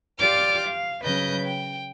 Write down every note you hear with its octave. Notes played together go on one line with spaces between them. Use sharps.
F4 G4 D5 D6 F6
F5
C#3 F#3 B4 D#5 G6
G5